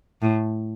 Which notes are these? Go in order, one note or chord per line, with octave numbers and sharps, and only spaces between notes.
A2